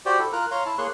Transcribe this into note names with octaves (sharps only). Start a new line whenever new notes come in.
F#4 G4 C5 D5 G5
E4 A4
F4 A#4 A#5 F6 F#6
C#5 F5 A#5 C6
E4 A5
A#3 G#4 C#5 C6 C#6 F#6